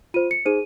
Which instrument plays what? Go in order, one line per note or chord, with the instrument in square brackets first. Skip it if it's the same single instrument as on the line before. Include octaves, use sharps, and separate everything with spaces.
[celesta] F4 C5 D#7
C#7
D#4 G#4 C5 D#7